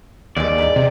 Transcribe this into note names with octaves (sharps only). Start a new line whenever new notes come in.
D#2 E3 G#3 D5
G#2 E3 D#4
C3